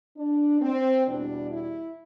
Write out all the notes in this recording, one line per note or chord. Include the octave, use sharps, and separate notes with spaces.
D4
C4
E2 B2 G3 D4
E4